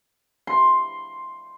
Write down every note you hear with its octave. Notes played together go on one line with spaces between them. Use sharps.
C6